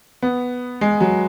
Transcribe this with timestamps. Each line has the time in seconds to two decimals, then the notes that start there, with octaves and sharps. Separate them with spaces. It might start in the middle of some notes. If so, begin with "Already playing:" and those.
0.22 B3
0.81 G#3
1.01 F#3